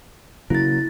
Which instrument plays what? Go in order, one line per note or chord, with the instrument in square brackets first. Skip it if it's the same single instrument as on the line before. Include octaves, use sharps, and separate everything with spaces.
[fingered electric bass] C#3 F#3 A#3 [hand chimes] E4 A6